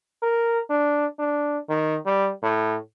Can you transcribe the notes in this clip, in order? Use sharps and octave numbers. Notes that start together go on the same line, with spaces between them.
A#4
D4
D4
D#3
G3
A2